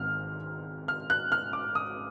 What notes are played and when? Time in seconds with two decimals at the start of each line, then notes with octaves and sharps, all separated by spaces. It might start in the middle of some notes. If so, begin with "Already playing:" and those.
Already playing: G#1 G#2 D#3 F6
0.88 F6
1.10 F#6
1.32 F6
1.53 D6
1.75 D#6